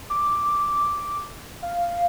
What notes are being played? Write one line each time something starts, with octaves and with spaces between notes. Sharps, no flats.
D6
F5